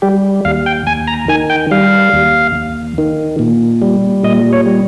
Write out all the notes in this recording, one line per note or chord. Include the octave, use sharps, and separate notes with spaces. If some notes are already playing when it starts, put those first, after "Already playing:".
G3 G4
D#2 F5
G5
D#2 G#5
A#5
D#3 G#5
G5
G3 F5
D#2
D#2
D#3
A#2
G3
A#2 D#5
C#5
G3